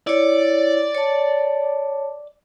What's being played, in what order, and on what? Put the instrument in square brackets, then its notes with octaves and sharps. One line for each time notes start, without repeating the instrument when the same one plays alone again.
[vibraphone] E4 C#5 [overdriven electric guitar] D5
[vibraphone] C#5 A5